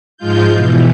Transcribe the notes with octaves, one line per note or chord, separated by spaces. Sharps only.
G#2 F3 G#3 F4 G6
B2 E3